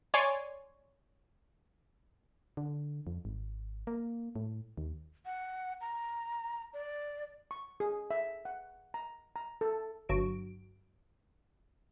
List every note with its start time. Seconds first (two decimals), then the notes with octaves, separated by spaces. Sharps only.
0.14 C#5 D5 G#5 C6
2.57 D3
3.07 F2
3.25 G#1
3.87 A#3
4.36 A2
4.78 D#2
5.25 F#5
5.81 A#5
6.73 D5
7.51 C#6
7.80 G#4
8.11 E5
8.45 F#5
8.94 A#5
9.36 A#5
9.61 A4
10.09 G1 F#3 D7